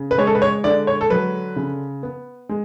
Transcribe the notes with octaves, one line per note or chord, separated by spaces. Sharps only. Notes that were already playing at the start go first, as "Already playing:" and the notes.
Already playing: C#3
B4
G#3 C#5
A4
B4
C#5
D3 D5
C#5
A4
F#3 B4
C#3
B3
G#3